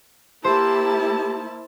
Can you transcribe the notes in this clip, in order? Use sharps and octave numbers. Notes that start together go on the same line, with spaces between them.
A#3 E4 G4 C5 A5